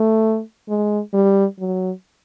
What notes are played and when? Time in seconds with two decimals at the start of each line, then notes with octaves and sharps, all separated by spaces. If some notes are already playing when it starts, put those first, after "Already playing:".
Already playing: A3
0.69 G#3
1.13 G3
1.59 F#3